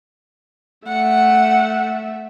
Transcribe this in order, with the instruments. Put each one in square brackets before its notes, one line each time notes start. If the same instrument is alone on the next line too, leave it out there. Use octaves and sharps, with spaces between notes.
[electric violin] A3 E5 [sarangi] F#5